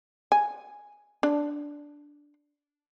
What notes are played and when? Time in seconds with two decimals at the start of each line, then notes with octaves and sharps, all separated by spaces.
0.32 G#5
1.23 D4